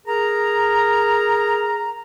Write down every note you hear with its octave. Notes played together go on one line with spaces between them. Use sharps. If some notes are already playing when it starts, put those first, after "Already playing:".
G#4 A#4 A#5